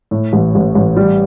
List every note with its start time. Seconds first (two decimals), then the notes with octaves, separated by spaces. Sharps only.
0.11 A2
0.33 A1
0.55 A1
0.75 A1
0.97 G3